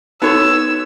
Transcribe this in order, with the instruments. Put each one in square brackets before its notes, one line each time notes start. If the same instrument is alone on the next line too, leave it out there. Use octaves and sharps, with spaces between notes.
[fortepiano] B3 C#5 [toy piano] D#4 F#4 A4 [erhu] E6